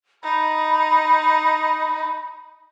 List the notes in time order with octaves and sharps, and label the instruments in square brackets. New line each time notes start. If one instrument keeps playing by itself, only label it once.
[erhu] D#4 [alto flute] B5